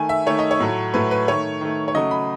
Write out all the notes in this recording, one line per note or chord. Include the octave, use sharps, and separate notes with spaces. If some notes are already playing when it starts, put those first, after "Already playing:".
Already playing: D#3 A3 G#5
E5
D#3 A3 C#5
D#5
C#5
A2 F#3 A3
A2 F#3 A3 B4
B4
D#3 A3 C#5
D#3 A3
C#5
C#3 F#3 A3 D#5
B5